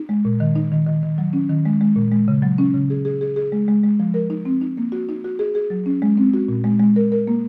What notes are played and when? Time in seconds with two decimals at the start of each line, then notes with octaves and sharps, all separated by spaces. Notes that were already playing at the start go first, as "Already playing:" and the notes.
Already playing: D#4
0.09 G#3
0.25 A#2
0.40 D#3
0.56 D#4
0.72 D#3
0.87 D#3
1.03 D#3
1.18 F#3
1.33 C#4
1.49 D#3
1.65 G#3
1.81 G#3
1.96 A#2
2.12 G#3
2.28 C#3
2.42 F#3
2.58 C#4
2.74 C#3
2.90 G#4
3.05 G#4
3.21 G#4
3.36 G#4
3.52 G#3
3.68 G#3
3.84 G#3
4.00 F3
4.14 A#4
4.30 D#4
4.45 C4
4.61 D#4
4.77 A#3
4.92 F#4
5.09 D#4
5.24 F#4
5.39 G#4
5.55 G#4
5.70 F#3
5.86 C#4
6.02 G#3
6.17 C4
6.34 F#4
6.48 A#2
6.64 G#3
6.80 G#3
6.96 A#4
7.12 A#4
7.27 A#3